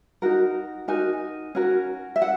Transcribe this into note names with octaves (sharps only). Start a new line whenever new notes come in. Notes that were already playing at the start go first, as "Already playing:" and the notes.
D#4 F#4 A#4
D#4 F#4 A#4 G#5
C#4 F#4 A#4
E5
F#5